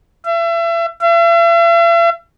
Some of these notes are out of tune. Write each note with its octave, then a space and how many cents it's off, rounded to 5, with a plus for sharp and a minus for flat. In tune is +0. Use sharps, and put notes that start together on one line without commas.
E5 +35
E5 +45